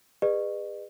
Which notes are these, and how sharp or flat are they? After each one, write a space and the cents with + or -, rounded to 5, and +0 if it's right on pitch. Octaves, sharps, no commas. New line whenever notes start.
G#4 -30 B4 +0 D#5 -45